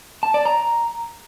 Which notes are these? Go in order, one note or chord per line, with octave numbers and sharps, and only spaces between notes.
A5
D5
A#5